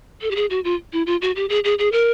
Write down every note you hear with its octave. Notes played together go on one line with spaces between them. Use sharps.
A4
G4
G#4
F#4
F4
E4
F4
F#4
G4
G#4
G#4
G#4
A#4